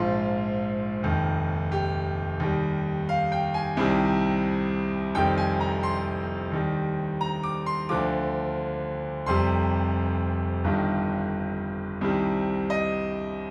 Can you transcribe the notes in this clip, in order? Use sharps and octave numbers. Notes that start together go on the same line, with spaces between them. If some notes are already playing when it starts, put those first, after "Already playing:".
Already playing: A#1 G#2 F3 F4
F1 D#2 D#3
G4
D#2 D#3 G3
F5
G5
G#5
C2 C3 D#3 G3
F1 F2 D#3 G3 G5
G#5
A#5
C6
D#2 D#3 G3
A#5
D6
C6
D2 D3 F3 D6
F1 F2 C3 G3 C6
G1 G2 D#3 G3
C2 C3 D#3 G3
D#5